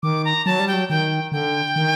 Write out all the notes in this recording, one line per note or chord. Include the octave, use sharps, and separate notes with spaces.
D#3 D6
A#5
F#3 A5
G3
G5
F#3
D#3 G5
D3 G5
D#3